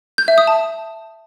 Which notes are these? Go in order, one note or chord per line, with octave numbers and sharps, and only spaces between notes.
G6
E5
D#6
A5